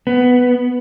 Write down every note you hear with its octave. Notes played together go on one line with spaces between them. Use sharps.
B3